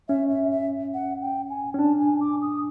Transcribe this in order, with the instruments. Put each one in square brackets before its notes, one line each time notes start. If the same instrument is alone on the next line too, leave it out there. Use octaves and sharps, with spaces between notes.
[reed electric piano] C#4 [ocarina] E5
[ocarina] E5
E5
F#5
G5
G#5
[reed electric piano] C#4
[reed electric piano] D4 [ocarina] A5
[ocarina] G#5
D6
D#6